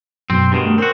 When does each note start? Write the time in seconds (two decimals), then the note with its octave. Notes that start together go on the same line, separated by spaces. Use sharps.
0.30 F#2 B2 C4
0.52 G2 B2 D#3 C6
0.64 A3
0.78 C4 F#4 A#4 C5 G5